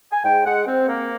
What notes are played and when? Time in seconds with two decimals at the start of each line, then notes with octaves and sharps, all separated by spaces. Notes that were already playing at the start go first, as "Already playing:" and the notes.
0.12 G#5
0.24 G#2 G5
0.46 G#3 F#5
0.66 C4
0.88 A#3